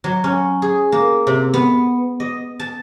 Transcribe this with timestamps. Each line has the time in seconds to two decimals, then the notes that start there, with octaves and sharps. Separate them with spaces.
0.04 F#3
0.24 C#4
0.62 G#4
0.92 A#3
1.27 C3
1.54 B3
2.20 D#5
2.60 A5